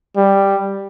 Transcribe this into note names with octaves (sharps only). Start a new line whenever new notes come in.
G3